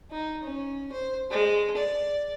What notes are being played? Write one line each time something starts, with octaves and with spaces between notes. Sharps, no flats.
D#4
C#4
C5
G#3
D5